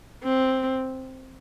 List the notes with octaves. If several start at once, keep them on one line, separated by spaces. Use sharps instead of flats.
C4